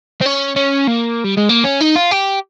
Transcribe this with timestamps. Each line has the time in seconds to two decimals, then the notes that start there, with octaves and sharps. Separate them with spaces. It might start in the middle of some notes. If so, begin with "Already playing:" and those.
0.21 C4
0.26 C#4
0.56 C#4
0.87 A#3
1.24 G3
1.37 G#3
1.49 A#3
1.64 C#4
1.80 D#4
1.95 F4
2.11 G4